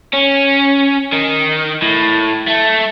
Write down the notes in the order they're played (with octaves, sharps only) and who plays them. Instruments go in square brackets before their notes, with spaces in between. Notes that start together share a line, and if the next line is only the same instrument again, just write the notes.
[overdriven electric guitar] C#4
D#3
A2
A3